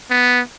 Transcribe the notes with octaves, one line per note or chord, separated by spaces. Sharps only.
B3